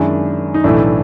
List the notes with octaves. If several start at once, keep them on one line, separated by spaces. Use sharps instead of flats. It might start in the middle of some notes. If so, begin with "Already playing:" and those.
Already playing: F#2 D#3 G#3 D4 E4
D#4
B1 A2 E3 A3 D4 E4